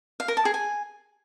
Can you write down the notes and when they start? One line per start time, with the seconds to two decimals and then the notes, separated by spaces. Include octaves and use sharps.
0.20 F5
0.28 A#4
0.37 A5
0.45 G#4
0.54 G#5